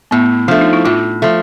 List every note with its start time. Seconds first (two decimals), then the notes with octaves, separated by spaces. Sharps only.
0.11 A2 B3
0.48 F3 A3 D4
0.61 D#4
0.73 E4
0.85 A2 F4
1.22 F3 A3